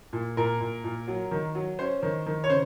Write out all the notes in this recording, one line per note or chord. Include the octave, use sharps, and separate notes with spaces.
A#2
A#2 A#4
A#2
A#2
F#3
D#3
F#3
C#4 C5
D#3
D#3
C#5
C#3 C5